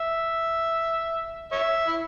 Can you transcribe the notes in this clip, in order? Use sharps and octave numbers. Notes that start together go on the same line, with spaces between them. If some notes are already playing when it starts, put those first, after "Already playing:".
Already playing: E5
C#5 E5
E4